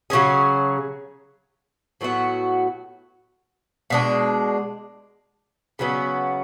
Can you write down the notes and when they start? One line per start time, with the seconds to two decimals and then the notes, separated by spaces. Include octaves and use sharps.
0.10 C#3 F#3 C#4 G#4
2.01 A2 F#3 B3 F#4
3.90 B2 G#3 D4
5.79 C#3 F#3 B3